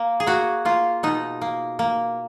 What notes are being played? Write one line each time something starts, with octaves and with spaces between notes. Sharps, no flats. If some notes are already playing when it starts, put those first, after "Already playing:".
Already playing: A#3
G#4
A#3 F#4
A#3 F4
B2 D#4
A#3
A#3